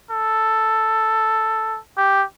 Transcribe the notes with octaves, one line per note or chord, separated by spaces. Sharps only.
A4
G4